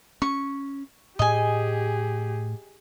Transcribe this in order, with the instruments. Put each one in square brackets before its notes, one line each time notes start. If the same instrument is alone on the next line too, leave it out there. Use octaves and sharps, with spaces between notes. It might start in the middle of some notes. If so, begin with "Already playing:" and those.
[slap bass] C#4 [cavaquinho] C#6
[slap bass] A2 [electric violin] G4 G#4 [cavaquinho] D#5 G#5